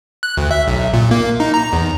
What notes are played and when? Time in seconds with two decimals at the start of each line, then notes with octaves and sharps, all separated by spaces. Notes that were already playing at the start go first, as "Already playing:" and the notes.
0.23 F#6
0.37 D2
0.51 E5
0.67 B1
0.93 A#2
1.11 A#3
1.40 D#4
1.54 A#5
1.73 E2